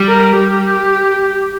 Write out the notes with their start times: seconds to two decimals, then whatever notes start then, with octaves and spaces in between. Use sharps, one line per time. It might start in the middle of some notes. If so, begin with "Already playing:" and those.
Already playing: G3
0.09 A#4
0.37 G4